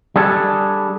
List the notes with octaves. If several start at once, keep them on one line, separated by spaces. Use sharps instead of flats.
G3 D4 G#4 A4